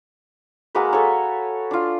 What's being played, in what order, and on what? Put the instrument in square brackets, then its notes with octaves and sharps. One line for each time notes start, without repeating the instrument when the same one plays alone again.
[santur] G#3 A#3 F#4 B4
A4 C#5
D4 F4